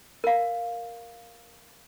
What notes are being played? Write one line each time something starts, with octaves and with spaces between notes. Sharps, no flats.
A#4 F5